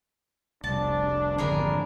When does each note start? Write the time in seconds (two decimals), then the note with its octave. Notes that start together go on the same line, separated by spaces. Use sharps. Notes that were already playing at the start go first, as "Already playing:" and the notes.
0.64 F1 C2 D4 A5
1.38 G#1 F2 D3 D4 G#4 A#4 B5